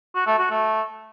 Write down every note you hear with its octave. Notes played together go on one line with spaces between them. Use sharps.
F#4
A3
F#4
A3